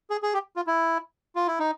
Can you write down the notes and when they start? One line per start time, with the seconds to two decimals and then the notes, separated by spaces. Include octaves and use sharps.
0.10 G#4
0.23 G#4
0.34 G4
0.56 F4
0.67 E4
1.36 F4
1.47 E4
1.59 D#4